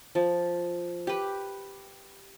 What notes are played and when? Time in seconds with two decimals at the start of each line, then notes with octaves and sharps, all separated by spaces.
0.15 F3
1.07 G4 B4